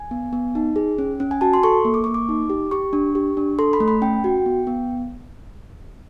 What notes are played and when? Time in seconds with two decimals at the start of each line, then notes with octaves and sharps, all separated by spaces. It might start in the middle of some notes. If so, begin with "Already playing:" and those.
Already playing: G#5
0.11 B3
0.33 B3
0.55 D#4
0.76 G#4
0.98 C#4
1.20 C#4
1.31 G#5
1.41 F#4 A5
1.53 C6
1.63 A4 C#6
1.85 A#3
1.94 D6
2.04 A#3 C#6
2.14 D6
2.29 D#4
2.50 G4
2.71 G4 C#6
2.93 D4
3.15 G4
3.37 D4
3.59 A4 C6
3.73 B5
3.80 A3
3.88 B5
4.02 C#4 G5
4.24 F#4
4.46 B3
4.67 B3